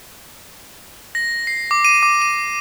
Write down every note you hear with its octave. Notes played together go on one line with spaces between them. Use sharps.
A#6
C7
D6
D#7
D6
D#7